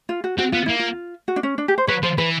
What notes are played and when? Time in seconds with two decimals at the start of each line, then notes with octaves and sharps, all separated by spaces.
0.09 F4
0.24 F#4
0.38 C4 F#4
0.52 B3 F4
0.66 A#3 E4
0.79 F4
1.28 F#4
1.36 D4
1.43 C#4
1.58 D4
1.68 G4
1.78 C5
1.87 F#3 B4 C#5
2.03 F3 C5
2.18 E3 B4